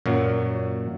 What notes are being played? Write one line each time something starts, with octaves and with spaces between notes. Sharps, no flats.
F#2 A#2 F#3